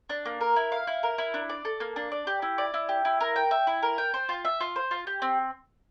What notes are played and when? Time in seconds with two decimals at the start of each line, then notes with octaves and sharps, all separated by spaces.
0.10 D4
0.25 A#3
0.41 A#4
0.56 E4
0.72 F5
0.87 E4
1.03 A#4
1.18 E4
1.34 D4
1.49 D5
1.65 A4
1.80 A#3
1.96 D4
2.12 D5
2.27 G4
2.42 E4
2.58 D5
2.74 E4
2.89 G4
3.05 E4
3.20 A#4
3.36 G5
3.51 E5
3.67 E4
3.82 A#4
3.98 G5
4.14 C5
4.29 F4
4.45 E5
4.61 F4
4.76 C5
4.91 F4
5.07 G4
5.22 C4